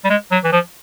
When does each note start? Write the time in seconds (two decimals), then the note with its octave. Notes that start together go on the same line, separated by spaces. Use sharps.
0.05 G3
0.10 G#3
0.31 F#3
0.44 E3
0.52 F3